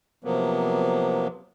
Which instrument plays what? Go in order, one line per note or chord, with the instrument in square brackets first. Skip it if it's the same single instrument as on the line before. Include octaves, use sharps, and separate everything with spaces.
[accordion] C3 F3 F#3 A#3 B3